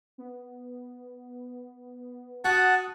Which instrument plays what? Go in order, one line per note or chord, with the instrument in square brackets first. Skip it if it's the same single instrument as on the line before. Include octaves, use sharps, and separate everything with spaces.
[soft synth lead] B3
[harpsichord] F#4 [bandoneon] F#5 [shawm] A5 [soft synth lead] D#6